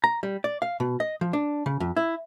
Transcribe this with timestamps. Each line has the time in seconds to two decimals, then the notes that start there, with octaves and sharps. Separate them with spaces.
0.04 A#5
0.23 G3
0.44 D5
0.62 F5
0.80 B2
1.00 D#5
1.21 F3
1.33 D4
1.66 C#3
1.80 F2
1.96 E4